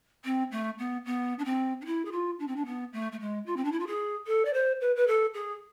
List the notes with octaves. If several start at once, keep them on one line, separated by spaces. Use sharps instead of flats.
C4
A3
B3
B3
D4
C4
D4
E4
G#4
F4
D4
C4
D4
B3
A3
A3
G#3
F4
C4
D4
E4
F4
G#4
A4
D5
C5
B4
B4
A4
G#4